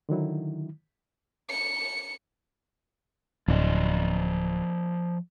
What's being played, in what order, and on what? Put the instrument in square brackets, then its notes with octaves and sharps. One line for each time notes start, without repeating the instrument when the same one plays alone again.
[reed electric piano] D3 D#3 F#3 E4
[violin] C#7
[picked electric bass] D1 [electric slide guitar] F3 D5 D#5